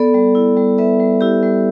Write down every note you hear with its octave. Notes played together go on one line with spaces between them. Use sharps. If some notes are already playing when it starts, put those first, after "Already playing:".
Already playing: B3 A4 D5
G3
E4
G3
B3 B4 E5
G3
E4 G4
G3